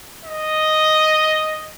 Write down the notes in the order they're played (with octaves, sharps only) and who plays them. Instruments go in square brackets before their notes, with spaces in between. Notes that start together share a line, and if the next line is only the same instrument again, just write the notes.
[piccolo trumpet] D#5